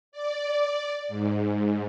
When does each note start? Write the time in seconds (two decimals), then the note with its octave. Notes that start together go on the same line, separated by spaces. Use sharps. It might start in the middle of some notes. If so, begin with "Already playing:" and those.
0.12 D5
1.08 G#2